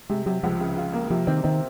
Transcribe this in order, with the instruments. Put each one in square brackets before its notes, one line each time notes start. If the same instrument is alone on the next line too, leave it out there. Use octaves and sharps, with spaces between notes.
[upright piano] C3 [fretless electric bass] G#3
[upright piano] C3 [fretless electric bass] F#3
[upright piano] C#2 [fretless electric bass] F3
[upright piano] C#3
F4
A#3
[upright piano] C3 [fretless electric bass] F3
[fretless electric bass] D#3 [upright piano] C4
[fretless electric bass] D#3 [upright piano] C4